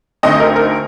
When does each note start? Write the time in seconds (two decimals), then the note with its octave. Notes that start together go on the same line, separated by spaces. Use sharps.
0.23 D2 D3 A3 C4 D#4 D#5
0.40 A#4
0.56 A#4